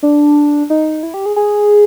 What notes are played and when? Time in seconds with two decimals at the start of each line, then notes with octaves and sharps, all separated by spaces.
0.03 D4
0.70 D#4
1.03 E4
1.14 G4
1.26 G#4
1.36 G#4